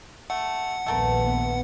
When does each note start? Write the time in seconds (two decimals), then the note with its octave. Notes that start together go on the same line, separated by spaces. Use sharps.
0.30 A3 F#5
0.86 A#1 D#2 A3 B3 A4 A#4